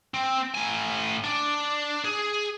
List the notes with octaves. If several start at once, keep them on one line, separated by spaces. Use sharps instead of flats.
C4
A2 G#5
D4
G#4